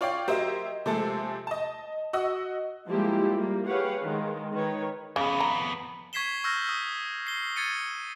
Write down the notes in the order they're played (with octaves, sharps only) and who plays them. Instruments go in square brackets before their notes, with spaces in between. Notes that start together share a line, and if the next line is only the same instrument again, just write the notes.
[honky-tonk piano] F4 C#5 D5 F5 G5
F#3 G4 A#4 C5 D#5 E5
C3 F3 G#3 A3 A4
D#5 A5
F#4 D#5 F#5 E6
[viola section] F3 G3 G#3 A#3 E4 G4
G3 A#3
G4 G#4 B4 C#5 F5 F#5
D#3 G#3
D#3 B4 C#5
[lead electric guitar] F2 B3 [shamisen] C#3
[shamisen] A#5
[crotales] C#6 G#6 B6 C7 E7 G7
C#6 E6 F6 G6 A#6
D#6
C7 G7
G#6 A6 C#7 D#7